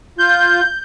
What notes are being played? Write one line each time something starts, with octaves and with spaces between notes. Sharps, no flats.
F4 G6